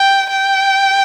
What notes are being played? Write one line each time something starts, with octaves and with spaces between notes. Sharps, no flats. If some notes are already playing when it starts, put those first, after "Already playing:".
Already playing: G5
G5